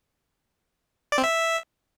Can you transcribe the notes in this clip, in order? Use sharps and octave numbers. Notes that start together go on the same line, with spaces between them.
D5
C4
E5